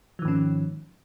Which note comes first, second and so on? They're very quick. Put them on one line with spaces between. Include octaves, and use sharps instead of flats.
F3 D#3 G#2 C#4